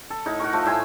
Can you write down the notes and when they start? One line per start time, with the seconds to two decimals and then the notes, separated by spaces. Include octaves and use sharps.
0.10 A4
0.26 A2 D#4
0.40 F#4 A#4 C#6
0.53 F3 A3
0.66 A2 E5 G#5 C6